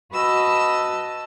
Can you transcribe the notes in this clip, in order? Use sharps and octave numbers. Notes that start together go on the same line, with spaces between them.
F#4 B4 D#5 A5 E6